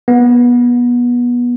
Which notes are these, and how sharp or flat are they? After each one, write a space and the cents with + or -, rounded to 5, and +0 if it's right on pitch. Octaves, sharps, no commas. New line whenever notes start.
B3 -25